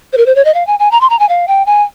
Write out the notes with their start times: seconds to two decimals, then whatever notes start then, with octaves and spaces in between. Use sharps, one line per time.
0.13 C5
0.17 A#4
0.26 C5
0.36 C#5
0.45 D#5
0.54 F5
0.67 G#5
0.79 G#5
0.91 A#5
1.01 C6
1.10 A#5
1.19 G#5
1.29 F5
1.48 G5
1.66 G#5